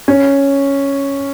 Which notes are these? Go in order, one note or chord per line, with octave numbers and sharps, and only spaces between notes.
C#4